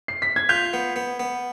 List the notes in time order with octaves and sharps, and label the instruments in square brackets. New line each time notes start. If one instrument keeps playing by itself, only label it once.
[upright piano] C7
B6
G#6
[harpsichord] F4 [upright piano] G6
[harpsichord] B3
B3
B3